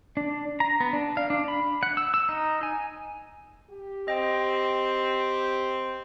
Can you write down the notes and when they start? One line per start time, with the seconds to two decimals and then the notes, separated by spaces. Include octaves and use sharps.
0.17 D4
0.60 A#5
0.80 B3
0.93 D4
1.17 F5
1.30 D4
1.48 B5
1.83 F#5
1.97 E6
2.14 E6
2.29 D#4
2.63 G#5
3.70 G4
4.08 C4 D#5 G5